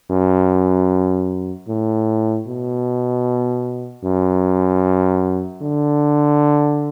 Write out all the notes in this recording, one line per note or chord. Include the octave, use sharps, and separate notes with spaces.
F#2
A2
B2
F#2
D3